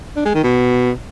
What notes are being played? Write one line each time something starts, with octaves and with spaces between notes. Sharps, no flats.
D4
G#3
D#3
B2